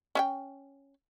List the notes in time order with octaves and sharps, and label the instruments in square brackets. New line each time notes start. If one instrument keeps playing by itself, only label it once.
[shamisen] C#4 E5 G5